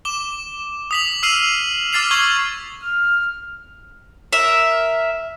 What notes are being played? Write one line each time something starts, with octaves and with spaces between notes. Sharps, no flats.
D6 E7 G7
D#6 B6 F#7
E6 F6 C7 D#7 E7 F#7
D6 F6 A6 C7 F7
C#6 F6 G#6 F#7 G7
F6
A#4 E5